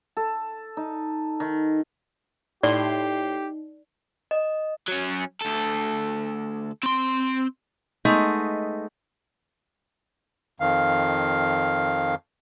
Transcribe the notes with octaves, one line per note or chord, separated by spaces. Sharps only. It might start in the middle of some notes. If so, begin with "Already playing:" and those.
A4
D#4
D#3
A2 D#4 G4 D5 C6
D#5
F#3 C#4
D2 A4
C4 C6
G#3 A3 B3 D#4
F2 D#3 F5